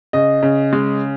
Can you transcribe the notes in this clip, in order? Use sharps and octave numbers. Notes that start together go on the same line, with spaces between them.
C#3 D#5
C#3
G#3